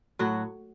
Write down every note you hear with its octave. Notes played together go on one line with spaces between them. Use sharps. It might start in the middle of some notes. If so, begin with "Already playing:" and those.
A2 F#3 F#4